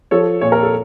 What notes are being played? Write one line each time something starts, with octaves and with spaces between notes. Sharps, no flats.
F3 A4 C#5
A#2 C#5
A#4
A4